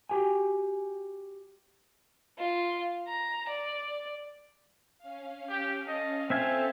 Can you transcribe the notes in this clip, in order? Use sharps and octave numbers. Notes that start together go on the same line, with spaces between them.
F#4 G4 G5 G#5
F4
A#5
D5
C#4 F5
G4
A4 D#5
C4 F4 A4 E5 F5 G#5 A5